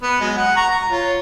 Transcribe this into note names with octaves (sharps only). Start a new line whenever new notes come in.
B3
F#3 G#3
F#5
A#5 C#6
A#5
F4 C#5